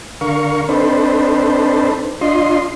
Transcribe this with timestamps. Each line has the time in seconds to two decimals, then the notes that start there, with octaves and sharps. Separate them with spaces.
0.21 D3 A#4 F5 C#6
0.69 C4 D4 D#4 A4 B4 C5
2.21 D4 F4 D#5 C6